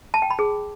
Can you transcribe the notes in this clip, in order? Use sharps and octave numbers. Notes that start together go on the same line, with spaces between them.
A5
G5
B5
G#4